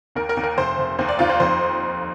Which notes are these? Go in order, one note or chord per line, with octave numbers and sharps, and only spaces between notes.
D#2 A#4
A#4
D#2
A#4
F1 C5
F1
D#2 C5
D5
D#2 F4
C5
F2 C5